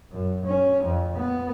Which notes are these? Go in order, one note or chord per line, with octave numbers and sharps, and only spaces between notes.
F#2
C#4
F2
B3